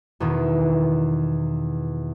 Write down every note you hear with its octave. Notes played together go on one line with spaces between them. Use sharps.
E2 B2 D#3